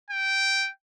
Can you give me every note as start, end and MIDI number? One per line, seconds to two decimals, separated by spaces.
0.10 0.70 79